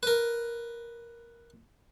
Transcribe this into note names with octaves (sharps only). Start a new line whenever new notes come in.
A#4 B4